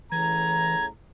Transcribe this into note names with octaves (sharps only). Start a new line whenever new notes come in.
A2 C#3 E3 A#5 G#6